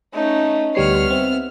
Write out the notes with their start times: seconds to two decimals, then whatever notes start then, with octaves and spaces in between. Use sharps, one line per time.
0.14 A3 C#4 D#4
0.75 D2 G3 B3 C#5 F6 C7
1.10 C4 E5